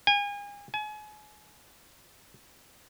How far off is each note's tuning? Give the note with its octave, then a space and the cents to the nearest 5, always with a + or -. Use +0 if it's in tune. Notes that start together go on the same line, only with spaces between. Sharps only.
G#5 -35
G#5 +35